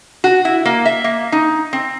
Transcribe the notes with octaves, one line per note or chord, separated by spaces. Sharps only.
F#4
E4
A#3
E5
A#3
D#4
C4